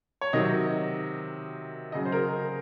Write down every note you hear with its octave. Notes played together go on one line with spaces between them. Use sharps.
C#5
C3 D#3 F#3 D#5
C#3 F#3 D#5
C5
A#4